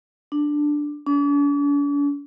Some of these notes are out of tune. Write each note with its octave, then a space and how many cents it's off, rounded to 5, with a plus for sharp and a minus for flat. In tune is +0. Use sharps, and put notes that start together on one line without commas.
D4 +5
D4 -45